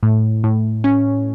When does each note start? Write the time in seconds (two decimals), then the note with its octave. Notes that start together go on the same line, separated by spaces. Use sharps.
0.03 A2
0.44 A2
0.84 C#4